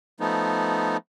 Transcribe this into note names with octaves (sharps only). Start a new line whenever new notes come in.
F3 A3 B3 D#4